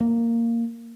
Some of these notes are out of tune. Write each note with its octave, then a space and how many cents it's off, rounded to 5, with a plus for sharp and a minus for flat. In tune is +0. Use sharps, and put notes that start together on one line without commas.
A#3 -10